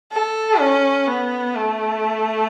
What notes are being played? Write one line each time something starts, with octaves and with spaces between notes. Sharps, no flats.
A4
C#4
B3
A3